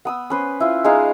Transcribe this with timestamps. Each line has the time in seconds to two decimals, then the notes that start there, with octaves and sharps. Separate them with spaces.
0.05 B3 D#6 E6
0.30 C#4 B4 C5
0.60 E4 F4
0.84 G#3 D#4 G#4 F5